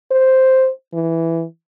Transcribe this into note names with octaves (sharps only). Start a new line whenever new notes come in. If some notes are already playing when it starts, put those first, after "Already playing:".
C5
E3